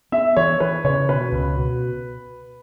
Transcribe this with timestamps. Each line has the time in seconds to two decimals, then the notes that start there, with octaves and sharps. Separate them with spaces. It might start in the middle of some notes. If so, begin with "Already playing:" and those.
0.12 B3 E5
0.36 E3 C#5
0.60 E3 B4
0.84 C#3 C#5
1.08 B2 B4
1.32 C#2
1.57 B2